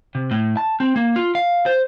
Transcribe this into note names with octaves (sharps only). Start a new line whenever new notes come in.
C3
A2
A5
C4
A#3
F4
F5
C5